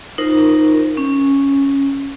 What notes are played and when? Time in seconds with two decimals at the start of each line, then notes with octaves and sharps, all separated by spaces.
0.18 D#4 F4 A#4 C5
0.97 C#4